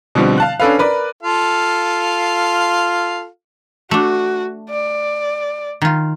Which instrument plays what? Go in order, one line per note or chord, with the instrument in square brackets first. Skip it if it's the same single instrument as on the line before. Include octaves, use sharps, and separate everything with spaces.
[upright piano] B2 D3 F3 G3 C4
F5 A5 F#6
C#4 D4 A4 B4 F5
A#4 B4 D5 B5
[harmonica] F4 A4 F5
[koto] A3 D4 [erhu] F#4
[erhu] D5
[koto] D#3 F4